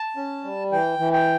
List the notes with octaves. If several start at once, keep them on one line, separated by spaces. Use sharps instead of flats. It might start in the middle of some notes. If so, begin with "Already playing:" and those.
Already playing: A5
C#4
G3
E3 G5
E3
G5